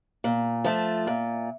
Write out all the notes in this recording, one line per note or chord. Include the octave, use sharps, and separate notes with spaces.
A#2
F3 A3
A#2